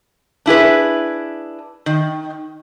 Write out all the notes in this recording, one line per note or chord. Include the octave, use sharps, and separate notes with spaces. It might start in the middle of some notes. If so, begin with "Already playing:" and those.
D4 E4 G#4 B4
D#3